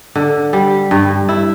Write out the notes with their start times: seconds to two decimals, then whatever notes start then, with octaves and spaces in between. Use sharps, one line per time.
0.16 D3
0.53 G3
0.91 G2
1.29 E4